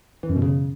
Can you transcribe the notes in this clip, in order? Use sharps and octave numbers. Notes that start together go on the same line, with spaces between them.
E3
F#2
B2
C#3